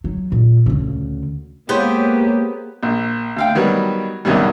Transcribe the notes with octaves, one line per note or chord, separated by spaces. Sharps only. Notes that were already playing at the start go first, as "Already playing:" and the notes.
F#3
A#2
D2 C#3
G#3 A#3 B3 G4 G#4 C5 C#5
A#1
D2 F5 G5
D#3 F#3 G3 B3
B1 E2 C3 D#3 F#3 G3